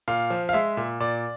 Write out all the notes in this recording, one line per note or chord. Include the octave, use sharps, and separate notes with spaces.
A#2 F5
F3
F5
G#3 E5
A#2
A#2 D5